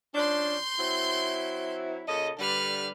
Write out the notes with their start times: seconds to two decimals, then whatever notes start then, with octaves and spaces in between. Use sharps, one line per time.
0.15 F3 C#4 D4 C6 G6
0.79 F#3 C4 E4
2.08 A#2 C#3 A4 D#5
2.39 D3 G3 B4 F6